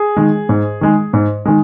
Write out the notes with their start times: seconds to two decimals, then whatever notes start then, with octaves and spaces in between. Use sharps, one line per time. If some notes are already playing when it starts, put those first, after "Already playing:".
Already playing: G#4
0.17 D#3 G#3
0.49 G#2
0.81 D#3 G#3
1.13 G#2
1.45 D#3 G#3